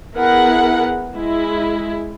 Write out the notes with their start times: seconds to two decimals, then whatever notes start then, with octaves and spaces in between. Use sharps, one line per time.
0.14 B3 E4 G#4 A#4 F#5
1.15 G#3 E4